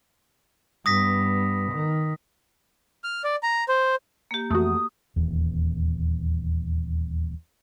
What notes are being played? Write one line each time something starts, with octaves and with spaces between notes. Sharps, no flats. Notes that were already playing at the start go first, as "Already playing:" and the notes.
G2 B3 D#6 A#6 B6
D#3
F6
D5
A#5
C5
A#3 G4
F2 E3 A3 F#4 D#6
D#1 E2